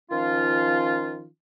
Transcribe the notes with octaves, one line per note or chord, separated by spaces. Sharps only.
D#3 F3 C#4 F4